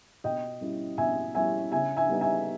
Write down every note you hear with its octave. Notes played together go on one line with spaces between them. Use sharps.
B2 D#5 G5
G3 C#4 E4
B2 E5 G#5
G3 C#4 E4 E5 G#5
C#3 E5 G#5
E5 G#5
G3 B3 D#4
E5 G#5